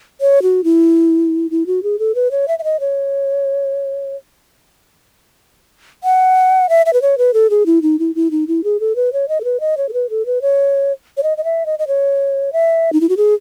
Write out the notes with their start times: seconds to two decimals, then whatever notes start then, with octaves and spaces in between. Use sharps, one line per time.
0.21 C#5
0.42 F#4
0.64 E4
1.51 E4
1.67 F#4
1.83 G#4
1.99 A4
2.15 B4
2.31 C#5
2.48 E5
2.59 E5
2.64 D#5
2.80 C#5
6.04 F#5
6.69 E5
6.86 E5
6.93 B4
7.02 C#5
7.18 B4
7.34 A4
7.50 G#4
7.66 E4
7.82 D#4
7.99 E4
8.15 E4
8.31 D#4
8.47 E4
8.64 G#4
8.80 A4
8.96 B4
9.13 C#5
9.29 D#5
9.41 A4
9.44 B4
9.60 D#5
9.77 C#5
9.89 A4
9.93 B4
10.10 A4
10.26 B4
10.42 C#5
11.17 C#5
11.23 D#5
11.37 D#5
11.44 E5
11.66 D#5
11.79 D#5
11.87 C#5
12.53 E5
12.93 D#4
13.01 E4
13.09 F#4
13.17 G#4